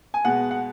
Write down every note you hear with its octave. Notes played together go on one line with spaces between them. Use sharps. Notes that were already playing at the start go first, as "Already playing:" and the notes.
G#5
B2 G#3 F#5
F#5